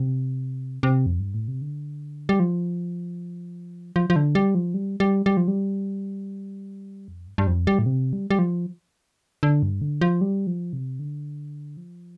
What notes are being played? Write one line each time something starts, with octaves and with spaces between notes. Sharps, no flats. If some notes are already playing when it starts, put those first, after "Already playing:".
Already playing: C3
C3
F2
G2
A2
C3
D3
G3
F3
F3
F3
D3
G3
F3
G3
G3
G3
F3
G3
F2
G2
G2
F2
G3
A2
C3
G3
G3
F3
D3
G2
D3
F3
G3
F3
C3
D3
F3